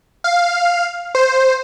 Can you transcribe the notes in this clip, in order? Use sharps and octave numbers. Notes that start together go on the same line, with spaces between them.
F5
C5